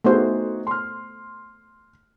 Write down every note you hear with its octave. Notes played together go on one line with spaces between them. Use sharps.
A3 B3 D#4 F#4 G#4 C5
C6 F6